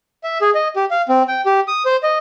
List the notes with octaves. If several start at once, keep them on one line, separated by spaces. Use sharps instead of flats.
E5
G#4
D#5
G4
F5
C4
G5
G4
D#6
C5
D#5